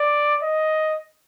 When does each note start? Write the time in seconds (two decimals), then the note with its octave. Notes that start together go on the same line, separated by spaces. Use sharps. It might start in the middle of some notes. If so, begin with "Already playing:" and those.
Already playing: D5
0.43 D#5